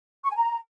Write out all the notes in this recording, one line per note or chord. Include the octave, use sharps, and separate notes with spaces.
C#6
G#5
A#5